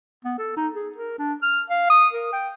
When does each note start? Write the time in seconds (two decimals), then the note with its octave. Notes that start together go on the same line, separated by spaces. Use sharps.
0.25 B3
0.38 A4
0.57 D#4
0.73 G#4
0.96 A#4
1.19 D4
1.42 F6
1.70 F5
1.90 D#6
2.13 A#4
2.33 G5